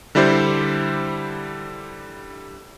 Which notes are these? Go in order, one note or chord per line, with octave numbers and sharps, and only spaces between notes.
D3 G3 E4 G4 C5